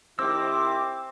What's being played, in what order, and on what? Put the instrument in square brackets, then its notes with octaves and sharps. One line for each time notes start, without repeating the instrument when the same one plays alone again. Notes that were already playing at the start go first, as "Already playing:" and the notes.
[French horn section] D#3 E4 G4 [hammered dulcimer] C4 [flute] D6 [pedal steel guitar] E6